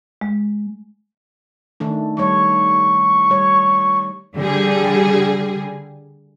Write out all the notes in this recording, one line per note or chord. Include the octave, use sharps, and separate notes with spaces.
G#3
D#3 A3 D4
G3 C#5 C#6
G3 C#5
D3 G3 G#4